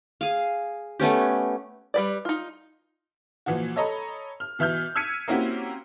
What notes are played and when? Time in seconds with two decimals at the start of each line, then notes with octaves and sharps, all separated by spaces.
0.21 G#4 F5
1.00 A3 B3 C#4 G4
1.94 G3 B4 D5
2.25 D#4 F4
3.46 A#2 E3 F3 F#4
3.76 A4 C#5 D#5 A#5 B5
4.40 F6
4.59 B2 E3 E5 F6 G6
4.95 E6 F6 G#6 B6 C#7 D#7
5.28 A#3 C4 C#4 E4 F#4 G4